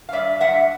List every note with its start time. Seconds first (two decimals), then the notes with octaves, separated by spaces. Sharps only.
0.09 F5
0.12 G2 D5 E5
0.40 G2 E5 F#5